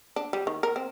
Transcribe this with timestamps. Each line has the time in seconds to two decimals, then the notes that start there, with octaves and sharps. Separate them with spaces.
0.16 D4
0.33 G3
0.47 D#3
0.63 A#4
0.76 C4